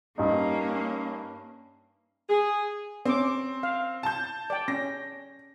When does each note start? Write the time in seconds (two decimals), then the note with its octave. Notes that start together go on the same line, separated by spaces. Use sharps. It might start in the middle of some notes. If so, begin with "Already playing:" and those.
0.18 G2 A#3 C#4 D#4
2.29 G#4
3.06 C4 C#4 D6
3.63 F5
4.03 A5 G6
4.50 D5 G5
4.68 C#4 A#6